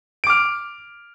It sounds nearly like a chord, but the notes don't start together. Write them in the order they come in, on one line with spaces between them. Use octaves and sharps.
D7 D6 F6